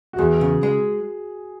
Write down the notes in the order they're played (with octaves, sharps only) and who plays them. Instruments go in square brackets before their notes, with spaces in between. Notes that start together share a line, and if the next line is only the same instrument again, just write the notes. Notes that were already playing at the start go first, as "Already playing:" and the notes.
[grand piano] F#4
[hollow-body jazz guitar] E2 [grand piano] G#4
[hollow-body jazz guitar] C#3
G#3